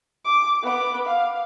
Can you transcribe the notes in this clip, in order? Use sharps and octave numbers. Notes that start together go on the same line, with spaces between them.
D6
B3 D6
F5